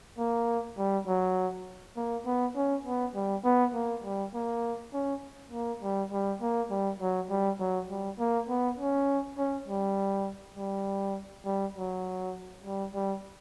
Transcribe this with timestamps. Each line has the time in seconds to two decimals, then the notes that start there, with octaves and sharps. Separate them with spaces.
0.18 A#3
0.78 G3
1.07 F#3
1.96 A#3
2.26 B3
2.56 C#4
2.85 B3
3.15 G3
3.44 B3
3.74 A#3
4.04 G3
4.34 A#3
4.93 C#4
5.52 A#3
5.82 G3
6.12 G3
6.41 A#3
6.71 G3
7.00 F#3
7.30 G3
7.60 F#3
7.90 G3
8.19 A#3
8.49 B3
8.78 C#4
9.38 C#4
9.68 G3
10.57 G3
11.45 G3
11.75 F#3
12.64 G3
12.94 G3